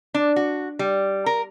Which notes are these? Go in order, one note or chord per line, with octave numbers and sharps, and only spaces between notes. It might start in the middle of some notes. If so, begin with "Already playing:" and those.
D4
F#4
G3
A#4